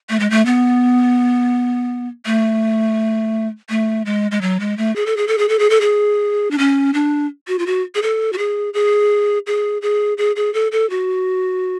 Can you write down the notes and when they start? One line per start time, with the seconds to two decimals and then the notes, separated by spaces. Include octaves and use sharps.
0.10 A3
0.20 G#3
0.30 A3
0.46 B3
2.26 A3
3.70 A3
4.06 G#3
4.31 G#3
4.41 F#3
4.60 G#3
4.78 A3
4.96 G#4
5.06 A4
5.17 G#4
5.27 A4
5.38 G#4
5.49 A4
5.59 G#4
5.70 A4
5.81 G#4
6.51 D4
6.58 C#4
6.94 D4
7.48 F#4
7.59 F4
7.66 F#4
7.95 G#4
8.02 A4
8.33 F#4
8.38 G#4
8.74 G#4
9.47 G#4
9.82 G#4
10.18 G#4
10.36 G#4
10.54 A4
10.72 A4
10.90 F#4